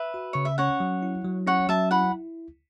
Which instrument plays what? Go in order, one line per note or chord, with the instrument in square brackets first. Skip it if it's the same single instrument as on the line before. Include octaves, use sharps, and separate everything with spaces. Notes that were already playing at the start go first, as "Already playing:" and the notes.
Already playing: [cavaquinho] B4 E5
[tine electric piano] F#4
[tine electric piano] C#3 [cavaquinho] C#5
[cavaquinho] E5
[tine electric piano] C#4 [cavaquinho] C#5 F#5
[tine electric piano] F#3
E4
F#3
[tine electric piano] C#4 [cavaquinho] C#5 F#5
[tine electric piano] F#3 [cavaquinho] E5 A5
[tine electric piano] E4 [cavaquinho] F#5 B5